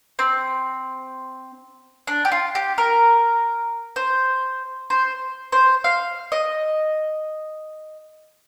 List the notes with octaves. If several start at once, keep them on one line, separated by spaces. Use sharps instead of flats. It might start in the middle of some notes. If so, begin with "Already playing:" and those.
C4
D4
G4
F4
G4
A#4
C5
C5
C5
F5
D#5